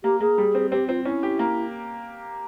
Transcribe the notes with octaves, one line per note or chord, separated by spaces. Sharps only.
A#3 G4
A#3 G#4
G3
C4
C4 G4
C4 F4
C#4 E4
G4
A#3